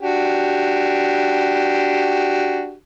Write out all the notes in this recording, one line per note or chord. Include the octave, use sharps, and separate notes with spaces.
D4 F#4 G4